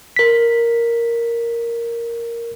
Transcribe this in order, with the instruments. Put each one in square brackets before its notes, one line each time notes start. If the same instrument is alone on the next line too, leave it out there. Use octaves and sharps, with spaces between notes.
[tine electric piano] A#4 B6